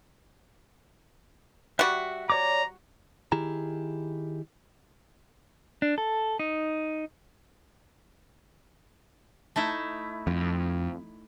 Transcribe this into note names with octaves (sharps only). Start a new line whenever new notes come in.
G3 F#4 E5 F#6
C#5 D5 A#5 D6
D#3 E4 G4 G#4 A#5
D4
A4
D#4
A3 D#4 E4
F2